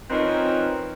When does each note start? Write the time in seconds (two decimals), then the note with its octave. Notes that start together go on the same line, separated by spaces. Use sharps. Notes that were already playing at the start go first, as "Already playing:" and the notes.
0.10 F3 C4 C#4 D#4 A#4 B4